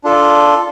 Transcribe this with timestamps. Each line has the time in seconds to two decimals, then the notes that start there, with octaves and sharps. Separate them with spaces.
0.04 D4 F4 A4